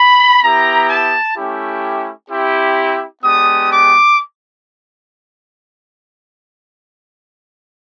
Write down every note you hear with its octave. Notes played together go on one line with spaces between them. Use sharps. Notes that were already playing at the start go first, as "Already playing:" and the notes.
Already playing: B5
B3 E4 G4 A#5
A5
A3 C#4 E4 G4
C4 E4 G4
G#3 B3 D4 G4 D#6
D6